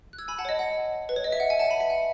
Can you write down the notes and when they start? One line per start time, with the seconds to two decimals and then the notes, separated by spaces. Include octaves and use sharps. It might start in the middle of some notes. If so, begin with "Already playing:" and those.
0.13 F#6
0.18 E6 G#6
0.28 G#5 B5
0.38 F#5 A5
0.45 C#5
0.49 D#5
0.59 F#5
1.09 B4
1.16 C#5
1.24 D#5
1.32 E5
1.40 F#5
1.50 E5 G#5
1.59 F#5 A5
1.70 G#5 B5
1.80 E5 G#5
1.90 F#5